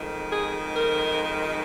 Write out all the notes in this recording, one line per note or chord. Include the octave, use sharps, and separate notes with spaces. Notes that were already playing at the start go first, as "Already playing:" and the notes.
Already playing: F2 D#3 G#3
G#4
A#4